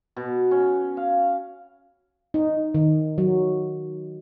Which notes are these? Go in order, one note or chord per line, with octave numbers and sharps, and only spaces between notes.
B2
C#4
F5
D#4
D#3
F#3